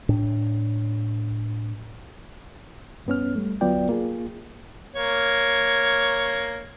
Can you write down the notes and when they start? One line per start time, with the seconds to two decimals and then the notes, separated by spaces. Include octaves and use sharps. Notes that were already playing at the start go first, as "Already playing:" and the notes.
0.09 A2 D4
3.06 G2 B3 C#4 F6
3.36 G3 A3
3.61 D2 F#3 B3 F4 D5 G5
3.89 A#3 F4 G#4
4.96 A#3 C#5